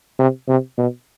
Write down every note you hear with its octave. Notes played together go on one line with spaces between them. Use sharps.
C3
C3
B2